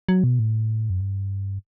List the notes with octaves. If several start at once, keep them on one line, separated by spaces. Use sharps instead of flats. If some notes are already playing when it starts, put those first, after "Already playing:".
F#3
B2
A2
F#2
G2